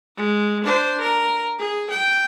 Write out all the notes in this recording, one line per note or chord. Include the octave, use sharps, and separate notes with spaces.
G#3
D4 C5
A#4
G#4
G5